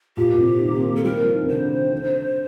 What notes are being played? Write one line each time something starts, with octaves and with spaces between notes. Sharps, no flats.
A#2 G4
A#2
C3
D#3
A#3
C4
A#3
A4
G3 A#4
F3
D#3
C3
D3 C5
D3